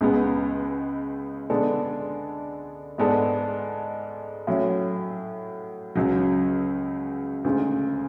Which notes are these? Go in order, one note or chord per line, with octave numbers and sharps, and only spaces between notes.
C#2 C#3 G#3 B3
D3 G#3 B3 D4 A4
G#2 G#3 B3 D4 A4
A2 F#3 C#4
C#2 C#3 F#3
D2 C#3 G#3